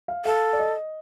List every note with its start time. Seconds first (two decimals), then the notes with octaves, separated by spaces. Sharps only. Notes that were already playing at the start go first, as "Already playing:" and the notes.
0.08 F5
0.25 A4 F5
0.53 D5
0.60 D#5